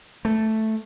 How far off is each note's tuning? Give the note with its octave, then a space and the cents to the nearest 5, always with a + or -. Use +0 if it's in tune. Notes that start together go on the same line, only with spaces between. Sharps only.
A3 +0